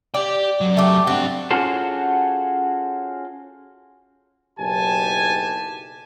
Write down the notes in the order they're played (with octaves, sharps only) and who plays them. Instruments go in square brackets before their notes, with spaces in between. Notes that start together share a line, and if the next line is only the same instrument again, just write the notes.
[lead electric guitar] G4 G5 [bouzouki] D5
[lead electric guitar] F#2 F#3
[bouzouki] A3 G4
[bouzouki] C4 F#4 [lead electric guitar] D4 G4
[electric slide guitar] C#4 F4 F#4 G#4 A4 C5
[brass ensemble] F#1 B1 G4 G#5 A5